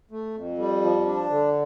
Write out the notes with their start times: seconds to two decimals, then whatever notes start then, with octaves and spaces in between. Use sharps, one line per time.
0.11 A3
0.34 F2
0.58 G3
0.83 F3
1.06 D4
1.30 D3